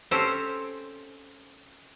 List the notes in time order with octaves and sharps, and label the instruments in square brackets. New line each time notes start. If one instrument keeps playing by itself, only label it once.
[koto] C4 C#4 G4 A4 C5